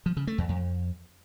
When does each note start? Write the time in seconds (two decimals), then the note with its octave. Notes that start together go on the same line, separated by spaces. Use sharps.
0.06 F3
0.17 C#3
0.27 A3
0.38 E2
0.49 F2